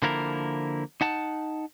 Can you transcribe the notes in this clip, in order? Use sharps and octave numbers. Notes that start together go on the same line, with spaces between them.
D3 F3 A#3 E4 A#4
D#4 F#5 A5